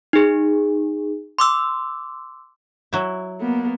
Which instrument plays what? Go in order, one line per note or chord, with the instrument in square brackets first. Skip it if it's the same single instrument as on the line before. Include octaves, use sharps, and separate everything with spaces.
[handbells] D#4 G#4
C6 D6 E6
[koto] F#3 E4
[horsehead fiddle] A#3 B3